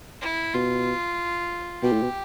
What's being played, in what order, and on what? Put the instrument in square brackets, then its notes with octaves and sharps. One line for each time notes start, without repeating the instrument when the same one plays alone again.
[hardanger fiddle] E4
[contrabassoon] B2 [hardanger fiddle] F4
[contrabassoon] B2 [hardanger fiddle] G4
[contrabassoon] A2
B2